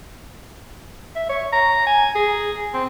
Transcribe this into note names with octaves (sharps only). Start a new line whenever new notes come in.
E5
C#5
A#5
G#5
G#4
C4